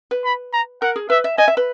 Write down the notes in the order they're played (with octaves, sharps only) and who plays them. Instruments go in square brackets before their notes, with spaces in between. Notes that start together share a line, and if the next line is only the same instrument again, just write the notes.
[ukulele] B4
[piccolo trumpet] B5
A#5
[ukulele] A#4 [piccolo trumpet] F#5
[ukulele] G#4
[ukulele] B4 [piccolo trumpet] E5
[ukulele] E5
[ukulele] D#5 [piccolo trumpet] G#5
[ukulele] E5
B4